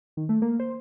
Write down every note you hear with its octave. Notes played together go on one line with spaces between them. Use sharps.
D#3
A3
A#3
C5